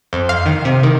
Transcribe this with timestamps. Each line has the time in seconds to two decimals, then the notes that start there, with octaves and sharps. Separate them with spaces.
0.13 F2
0.29 F5
0.46 D#3
0.65 C3
0.83 D#3